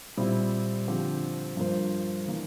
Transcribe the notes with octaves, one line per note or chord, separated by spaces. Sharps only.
A#2 G3 C4 E4
D3 F3 C4 G4 C5
G2 F3 A#3 F4 C5
E3 A#3 D4